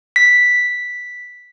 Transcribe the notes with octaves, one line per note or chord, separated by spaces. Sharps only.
B6